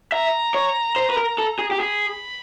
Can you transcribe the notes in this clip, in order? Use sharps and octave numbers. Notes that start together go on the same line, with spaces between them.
E5 A#5
C#5
C5
B4
A#4
A4
G#4
G4
G#4 B5